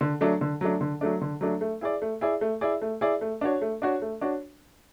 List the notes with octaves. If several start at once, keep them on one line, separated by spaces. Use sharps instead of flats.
D3
F#3 A3 D4
D3
F#3 A3 D4
D3
F#3 A3 D4
D3
F#3 A3 D4
A3
E4 G#4 D5
A3
E4 G#4 D5
A3
E4 G#4 D5
A3
E4 G#4 D5
A3
D4 F#4 C#5
A3
D4 F#4 C#5
A3
D4 F#4 C#5